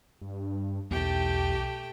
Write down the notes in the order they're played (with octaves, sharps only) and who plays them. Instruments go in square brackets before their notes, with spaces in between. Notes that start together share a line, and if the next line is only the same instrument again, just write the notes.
[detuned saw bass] G2
[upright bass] B1 [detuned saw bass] E2 [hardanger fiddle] A3 G5 [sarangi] G4